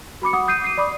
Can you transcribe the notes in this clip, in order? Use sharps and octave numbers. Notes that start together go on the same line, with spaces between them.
F#4 B5 D6 C#7
F#5 D6 D#6
D#6 G6 C7 D#7
C7 D#7
D5 B5 D6 D#6